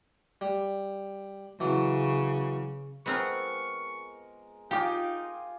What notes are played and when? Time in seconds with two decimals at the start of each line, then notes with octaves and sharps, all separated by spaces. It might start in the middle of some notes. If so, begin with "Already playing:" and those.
0.41 G3
1.60 C#3 E3 F#3
3.06 G#3 B3 C4 F4 A#4 C#6
4.71 D#4 F4 G4 F5 G5 G#5 D6